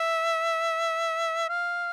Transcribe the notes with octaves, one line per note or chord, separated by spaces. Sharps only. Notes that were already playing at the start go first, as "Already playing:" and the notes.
Already playing: E5
F5